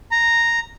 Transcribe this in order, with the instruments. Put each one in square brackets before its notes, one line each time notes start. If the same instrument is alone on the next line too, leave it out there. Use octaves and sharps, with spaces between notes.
[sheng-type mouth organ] A#5